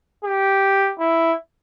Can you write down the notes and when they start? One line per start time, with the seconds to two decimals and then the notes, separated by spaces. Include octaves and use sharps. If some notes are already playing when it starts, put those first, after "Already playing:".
0.24 G4
0.99 E4